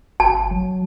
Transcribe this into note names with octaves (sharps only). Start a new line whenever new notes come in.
G1 A5
F#3